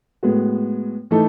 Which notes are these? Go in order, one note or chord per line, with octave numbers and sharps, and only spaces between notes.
A2 G#3 B3 F#4
E3 A3 D#4 A4